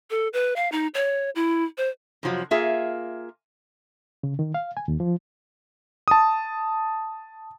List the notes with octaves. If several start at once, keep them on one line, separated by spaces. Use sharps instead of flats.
A4
B4
F5
D#4
C#5
E4
C5
F2 C3 F3 F#3
A#3 F4 G#4 E5
C#3
D#3
F5
G#5
D#2
F3
A5 D#6